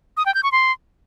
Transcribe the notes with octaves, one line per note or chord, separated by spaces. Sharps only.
D#6
G5
G6
C#6
C6